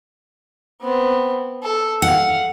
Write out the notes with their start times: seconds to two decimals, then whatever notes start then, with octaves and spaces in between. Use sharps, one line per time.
0.82 B3 C4
1.64 A4
2.02 F5 F#5